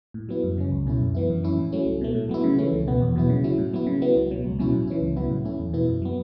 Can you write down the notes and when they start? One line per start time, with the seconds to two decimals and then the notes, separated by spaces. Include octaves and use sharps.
0.14 A2
0.29 F#3 B3 E4
0.44 F#2
0.58 C#3 F#3 C#4
0.71 C#2
0.87 B2 A3 C#4 E4
1.00 F#2
1.15 E3 B3 E4
1.30 F#2
1.44 E3 C#4 E4
1.57 A2
1.72 F#3 A3 C#4 E4
1.86 C#2
2.01 B2 A3
2.15 A2
2.29 F#3 B3 E4
2.44 C#3
2.58 E3 A3 C#4 E4
2.73 C#2
2.87 B2 B3
3.02 E2
3.16 B2 F#3 B3 E4
3.30 C#3
3.44 F#3 C#4 E4
3.58 A2
3.73 F#3 B3 E4
3.87 C#3
4.02 F#3 B3 E4
4.16 C#2
4.31 B2 F#3
4.44 C#2
4.59 B2 F#3 C#4 E4
4.73 A2
4.87 E3 C#4 E4
5.01 C#2
5.16 C#3 F#3 B3 E4
5.30 A2
5.45 A3 C#4 E4
5.59 E2
5.73 B2 B3 E4
5.88 F#2
6.02 F#3 B3